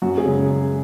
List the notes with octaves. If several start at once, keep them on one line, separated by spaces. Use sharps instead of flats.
F#2 F#4
G#4
C#3 G#3